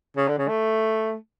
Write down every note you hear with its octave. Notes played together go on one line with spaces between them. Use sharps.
C#3
D3
C#3
A3